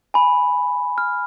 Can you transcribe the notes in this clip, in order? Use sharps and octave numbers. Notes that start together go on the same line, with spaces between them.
G#5 B5
F6